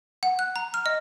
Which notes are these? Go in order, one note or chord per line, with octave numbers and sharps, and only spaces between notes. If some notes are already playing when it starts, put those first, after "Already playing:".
F#5
F#6
A#5
F6
D#5